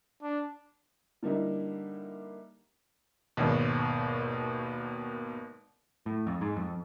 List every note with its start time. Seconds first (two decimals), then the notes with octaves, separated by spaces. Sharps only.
0.23 D4
1.23 D3 G3 A#3 D#4 E4
3.37 G#1 D#2 B2
6.06 A2
6.27 F2
6.41 G#2
6.56 F2